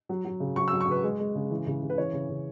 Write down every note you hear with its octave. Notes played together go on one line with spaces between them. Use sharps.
F#3
F#3
C#3
F#3 C#6
E6
F#3
C#6
C#3 B4
G#3
G#3
C#3
E3
C#3
C#3
B4
E3 C#5
C#3
C#3